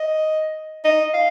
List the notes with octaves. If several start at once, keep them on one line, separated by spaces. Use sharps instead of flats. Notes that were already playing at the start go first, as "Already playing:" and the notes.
Already playing: D#5
D#5
F5